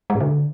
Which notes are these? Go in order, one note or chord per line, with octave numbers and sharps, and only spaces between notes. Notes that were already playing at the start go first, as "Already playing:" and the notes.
G#3
A2
D3